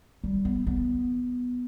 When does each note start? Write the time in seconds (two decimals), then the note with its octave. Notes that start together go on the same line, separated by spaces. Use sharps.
0.24 G3
0.45 B3
0.67 B3